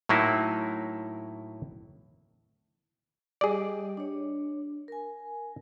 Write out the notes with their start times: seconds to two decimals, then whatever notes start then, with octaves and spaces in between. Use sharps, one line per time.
0.09 A2 F#3 A#3 D#4 E4
3.41 G3 G4 G#4 D5 D#5
3.97 D4 C#5
4.88 A#4 G#5